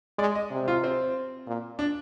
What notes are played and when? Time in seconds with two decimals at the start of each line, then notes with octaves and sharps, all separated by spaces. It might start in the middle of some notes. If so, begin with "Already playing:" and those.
0.19 G#3 D5
0.35 D#5
0.51 C3
0.68 F4
0.84 C4
1.47 A#2
1.79 D4